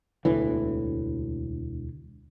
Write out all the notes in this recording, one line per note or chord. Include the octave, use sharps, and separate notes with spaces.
E1 D2 A2 E3